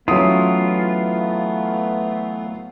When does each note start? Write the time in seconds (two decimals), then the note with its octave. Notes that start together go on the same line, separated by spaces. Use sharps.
0.08 E3 F#3 A3 B3 C#4 E4 F4 D#6